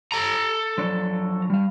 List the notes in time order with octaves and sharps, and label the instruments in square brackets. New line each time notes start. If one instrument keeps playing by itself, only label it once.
[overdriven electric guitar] A4 A#5
[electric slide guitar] F3 F#3 D4
G3 F5